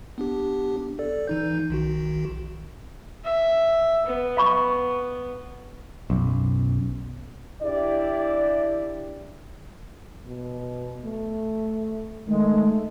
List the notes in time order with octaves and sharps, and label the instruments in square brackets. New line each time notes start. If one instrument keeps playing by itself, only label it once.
[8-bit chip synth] B3 D4 G4
A4 D5
E3 D#4 G6
B1 D#3 F#4
[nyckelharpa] E5
B3
[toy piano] F5 B5 C#6
[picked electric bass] B1 F#2
[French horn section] D4 E4 G4 D5
[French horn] B2
A3
[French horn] D#3 [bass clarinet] G#3 [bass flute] A3